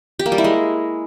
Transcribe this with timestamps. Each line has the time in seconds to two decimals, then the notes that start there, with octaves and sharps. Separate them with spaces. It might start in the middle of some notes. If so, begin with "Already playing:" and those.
0.19 G4
0.26 A#3
0.32 G3
0.38 E4
0.44 G#3